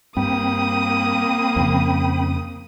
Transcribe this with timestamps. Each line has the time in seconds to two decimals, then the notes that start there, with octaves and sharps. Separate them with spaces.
0.17 G2 A#3 C4 G5 B5 D#6
1.56 F2 C#3